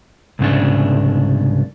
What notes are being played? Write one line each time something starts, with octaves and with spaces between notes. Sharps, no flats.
C2 G#2 C#3 D4